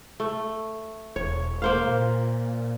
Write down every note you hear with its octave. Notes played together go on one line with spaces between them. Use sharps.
A3
E1 C#5
A#3 C5 F5
A#2